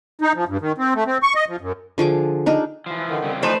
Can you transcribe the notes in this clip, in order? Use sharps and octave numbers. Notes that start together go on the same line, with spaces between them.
D#4
F3
G2
D#3
C4
A3
C4
C#6
D#5
F3
F#2
D3 F3 G#4 D6
D4 D#4 G#4 A#4
E3 F3
D3 D#3
C#3 G3 C4
E3 F3 A3 D#4 B4 C5